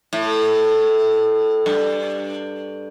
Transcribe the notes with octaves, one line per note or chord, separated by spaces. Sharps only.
A2
G2